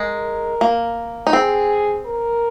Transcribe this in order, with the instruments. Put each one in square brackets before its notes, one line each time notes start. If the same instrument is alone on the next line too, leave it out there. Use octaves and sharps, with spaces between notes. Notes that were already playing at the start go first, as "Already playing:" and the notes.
Already playing: [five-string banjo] G#3 [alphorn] A#4
[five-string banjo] A#3
D#4
[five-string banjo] C4 [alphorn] G#4
[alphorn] A#4